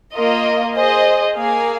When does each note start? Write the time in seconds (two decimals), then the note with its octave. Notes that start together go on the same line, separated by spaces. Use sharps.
0.13 A#3 F4 A#4 D#5
0.74 G#4 C5 D#5
1.35 A#3 G#4 F5 G#5